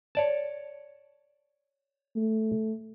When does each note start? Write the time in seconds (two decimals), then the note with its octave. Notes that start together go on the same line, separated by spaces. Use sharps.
0.15 C#5 D5 A5
2.16 A3